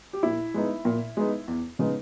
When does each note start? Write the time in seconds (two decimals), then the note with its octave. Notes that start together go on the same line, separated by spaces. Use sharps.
0.13 G4
0.23 A#2 E4
0.54 G#3 B3 D#4
0.85 A#2
1.17 G#3 B3 D#4
1.48 E2
1.79 C#3 G#3 B3 D#4